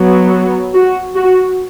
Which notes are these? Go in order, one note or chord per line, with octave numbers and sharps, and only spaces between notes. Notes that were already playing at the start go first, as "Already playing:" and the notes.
Already playing: F#3 B3
F#4
F#4